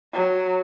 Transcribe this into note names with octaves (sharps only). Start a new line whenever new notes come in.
F#3